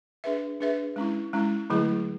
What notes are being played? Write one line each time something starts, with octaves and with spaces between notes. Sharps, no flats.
D4 G#4 B4 E5
D4 G#4 B4 E5
G#3 C#4 E4
G#3 C#4 E4
D3 F#3 A3 E4 G#4